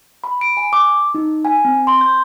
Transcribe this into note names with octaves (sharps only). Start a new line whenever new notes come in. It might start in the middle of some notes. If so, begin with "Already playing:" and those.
B5
D7
G#5
D6
D#4
G#5
C4
C6
G6